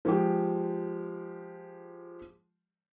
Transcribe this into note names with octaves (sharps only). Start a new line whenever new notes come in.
F3 G#3 G4